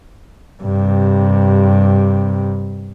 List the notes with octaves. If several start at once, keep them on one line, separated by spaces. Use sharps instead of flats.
G2 C3